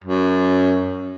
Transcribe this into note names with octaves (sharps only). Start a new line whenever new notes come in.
F#2